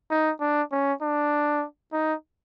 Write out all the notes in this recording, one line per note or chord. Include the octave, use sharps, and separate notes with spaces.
D#4
D4
C#4
D4
D#4